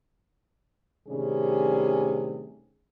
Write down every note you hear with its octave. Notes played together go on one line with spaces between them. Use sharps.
A2 C3 D#3 G3 C#4 G#4